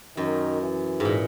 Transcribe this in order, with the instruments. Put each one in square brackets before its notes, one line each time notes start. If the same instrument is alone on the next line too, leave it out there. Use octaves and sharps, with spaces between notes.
[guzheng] F#2 [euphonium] D#3
[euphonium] E3
[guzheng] G#2
A#2